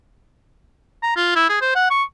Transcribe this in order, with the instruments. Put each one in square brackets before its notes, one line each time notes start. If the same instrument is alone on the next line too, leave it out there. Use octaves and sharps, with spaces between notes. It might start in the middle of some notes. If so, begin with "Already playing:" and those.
[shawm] A#5
F4
E4
G#4
C5
F#5
C#6